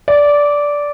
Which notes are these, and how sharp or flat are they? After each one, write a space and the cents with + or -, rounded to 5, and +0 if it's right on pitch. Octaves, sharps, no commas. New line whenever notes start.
D5 -10